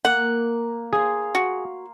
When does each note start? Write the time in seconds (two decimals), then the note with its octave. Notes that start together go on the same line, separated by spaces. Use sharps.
0.05 A#3 F#5
0.93 G#4 F5 C6
1.35 F#4